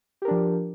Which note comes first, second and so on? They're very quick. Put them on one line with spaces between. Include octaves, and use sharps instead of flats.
G4 A#4 D4 F3